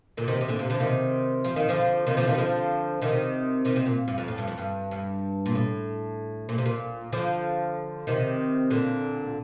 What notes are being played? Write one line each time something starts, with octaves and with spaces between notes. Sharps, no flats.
A#2 D3
C3 D#3
C3
A#2 D3
C3
D3 F3
C3 D#3
F3
D#3
D3 F3
C3 D#3
D3 F3
C3 D#3
D3 F3
C3 D#3
C3 D#3
C3
A#2
G2
F2
A2
G2
F2
G2
G2
A#2
A2
A#2
C3
A#2
D3 F3
C3 D#3
A#2 D3